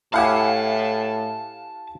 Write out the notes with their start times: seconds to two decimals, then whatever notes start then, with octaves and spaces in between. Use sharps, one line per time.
0.14 A2 E4 G4 F5 F#5 G#5 A5